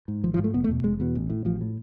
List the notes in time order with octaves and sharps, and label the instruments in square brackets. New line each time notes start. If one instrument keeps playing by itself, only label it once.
[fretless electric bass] G#2
G#1 F3
F3
G#2
A3
F1 B3
A3
E2 B2
F1 G#3
E2 B2
A1
A2
A1 F3
A2